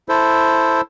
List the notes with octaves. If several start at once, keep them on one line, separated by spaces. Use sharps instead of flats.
E4 A4 C5